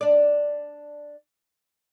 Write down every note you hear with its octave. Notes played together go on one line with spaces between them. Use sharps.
D4 D5